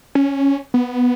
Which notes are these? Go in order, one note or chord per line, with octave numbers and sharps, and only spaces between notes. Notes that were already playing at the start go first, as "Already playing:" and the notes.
C#4
B3